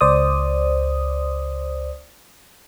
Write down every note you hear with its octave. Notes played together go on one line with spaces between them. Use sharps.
C#2 C5 D5 D#6